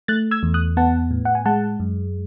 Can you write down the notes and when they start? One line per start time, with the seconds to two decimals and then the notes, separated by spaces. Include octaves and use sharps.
0.08 A3 F#6 A6
0.31 E6 G#6
0.43 E2
0.54 D#6 F#6
0.77 B3 F#5 A5
1.11 A2
1.25 F#5
1.35 G#5
1.46 G#3 F#5 A5
1.80 F#2